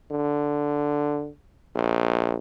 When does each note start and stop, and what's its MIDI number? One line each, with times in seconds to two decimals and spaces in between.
0.11 1.30 50
1.75 2.37 34